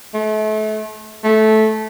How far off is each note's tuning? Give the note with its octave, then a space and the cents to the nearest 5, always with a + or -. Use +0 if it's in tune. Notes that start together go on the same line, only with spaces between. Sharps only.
A3 -35
A3 -15